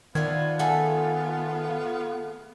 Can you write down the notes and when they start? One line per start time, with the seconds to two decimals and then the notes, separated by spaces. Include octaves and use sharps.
0.15 D#3 F3 B3 D4 E4 F4 G#6
0.59 A3 G#4 A4 F#5